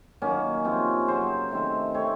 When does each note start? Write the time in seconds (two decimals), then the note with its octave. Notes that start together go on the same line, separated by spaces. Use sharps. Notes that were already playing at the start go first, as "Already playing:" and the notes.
0.22 D#3 F#3 A#3 C#4
0.65 C3 F3 C4
1.08 C#3 F#3 C4 C5
1.51 C3 D#3 A3 C4
1.94 D#3 A3 C4 C#5